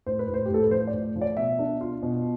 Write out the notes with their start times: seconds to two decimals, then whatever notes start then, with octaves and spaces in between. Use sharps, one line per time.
0.06 A2 C5
0.19 B4
0.28 A2
0.34 C5
0.45 G4
0.50 A2 A4
0.63 B4
0.71 F3 C5
0.87 D5
0.93 A2
1.16 F3
1.21 D5
1.37 B2 E5
1.59 D4
1.81 F4
2.03 B2